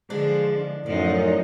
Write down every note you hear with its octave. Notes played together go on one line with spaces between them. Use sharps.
D3 E3 F3 G#3 D4
F#2 A2 F3 D#4 D5